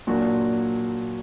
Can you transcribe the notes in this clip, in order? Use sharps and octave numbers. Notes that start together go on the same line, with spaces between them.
A#2 F#3 A#3 D4 F#4